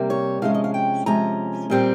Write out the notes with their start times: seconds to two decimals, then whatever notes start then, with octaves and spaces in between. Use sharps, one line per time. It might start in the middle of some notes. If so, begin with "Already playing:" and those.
Already playing: C3 G3 A#3
0.10 C#5
0.42 C3 F3 G#3 C#4 F5
0.54 D#5
0.64 F5
0.74 G5
1.06 C3 F3 G#3 C#4 A#5
1.70 A#2 G3 C4